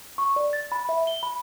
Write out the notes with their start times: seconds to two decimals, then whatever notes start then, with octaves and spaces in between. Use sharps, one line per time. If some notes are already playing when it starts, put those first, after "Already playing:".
0.18 C#6
0.36 D5
0.53 A6
0.72 B5
0.89 E5
1.07 G7
1.23 B5